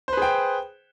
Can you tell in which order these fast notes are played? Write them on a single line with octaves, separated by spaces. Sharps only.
C5 B4 G#4 G5